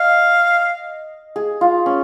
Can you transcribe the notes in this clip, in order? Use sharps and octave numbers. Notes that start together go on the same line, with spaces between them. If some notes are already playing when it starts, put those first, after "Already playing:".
Already playing: D#5 F5
G#4
F4
C#4